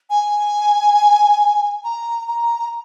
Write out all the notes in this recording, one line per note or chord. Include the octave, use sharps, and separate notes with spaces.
G#5
A#5
A#5